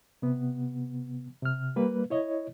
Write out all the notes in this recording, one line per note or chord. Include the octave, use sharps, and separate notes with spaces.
C3 B3
C3 F6
G3 A#3 B4
E4 C#5 D#5